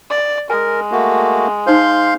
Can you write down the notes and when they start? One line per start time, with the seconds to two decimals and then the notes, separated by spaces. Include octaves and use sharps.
0.10 D5
0.50 G#3 A#4 G#5
0.92 A3 A#3 F#4
1.67 D#4 C5 F5 C6 G6